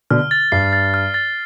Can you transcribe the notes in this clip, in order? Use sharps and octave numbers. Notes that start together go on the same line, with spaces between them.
B2 D3 F6
A6
G2 C7
A6
F6
A6